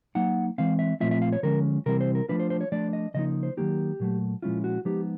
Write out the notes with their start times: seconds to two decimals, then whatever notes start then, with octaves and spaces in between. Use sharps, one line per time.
0.15 F#3 A#3 D#4 F#5
0.58 E3 G#3 C4 F5
0.79 E5
1.00 A#2 F3 A3 C4 F4 E5
1.11 E5
1.22 F5
1.33 C#5
1.43 D3 F3 G#3 C#4 A#4
1.86 C3 E3 G3 C4 E4 A#4
2.01 C5
2.15 A#4
2.29 F3 A3 D4 F4 B4
2.40 C5
2.50 C5
2.61 C#5
2.72 F3 A3 D4 D5
2.93 D#5
3.14 C#3 F3 A#3 D#4 D#5
3.43 C5
3.57 D#3 F#3 A#3 D#4 G4
4.00 A#2 F#3 A3
4.42 A#2 F3 G#3 C#4 E4 F4
4.64 F#4
4.85 F3 G#3 B3 D#4 G4